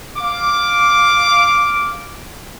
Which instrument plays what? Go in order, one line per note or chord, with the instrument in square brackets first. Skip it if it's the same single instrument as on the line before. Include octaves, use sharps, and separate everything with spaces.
[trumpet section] F5 D6